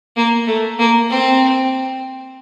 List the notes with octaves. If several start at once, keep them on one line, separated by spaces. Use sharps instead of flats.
A#3
A3
A#3
C4